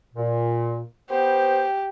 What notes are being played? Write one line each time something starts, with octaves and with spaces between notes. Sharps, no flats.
A#2
B3 G4 C5